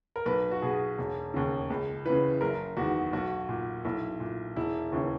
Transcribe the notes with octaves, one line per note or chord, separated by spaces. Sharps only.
A#4
B1 B4
F#4
B2 G#4
E1
D#2 C#3
C#2
C#3 E3 B4
F#1 A#4
E2 D#3 F#4
B1 F#4
A#2
B1 E4
A#2
E1 E4
D#2 C#3 E3